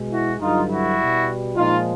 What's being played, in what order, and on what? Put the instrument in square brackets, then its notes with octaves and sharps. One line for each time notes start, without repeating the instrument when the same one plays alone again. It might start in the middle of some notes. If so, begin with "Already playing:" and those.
Already playing: [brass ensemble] B2 G#3
E4 F#4
G2 D3 F#3 D#4 F4
E4 F#4
B2 G3
A#2 F3 G#3 D#4 F4